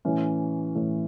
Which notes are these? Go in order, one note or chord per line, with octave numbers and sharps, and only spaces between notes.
A2 E3 C#4
A2 E3